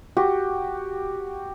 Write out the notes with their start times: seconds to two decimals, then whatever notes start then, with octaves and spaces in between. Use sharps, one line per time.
0.17 F#4 G4